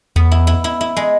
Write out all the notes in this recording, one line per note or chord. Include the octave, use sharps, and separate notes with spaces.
E2 B3
E4
E4
E4
E4
G#3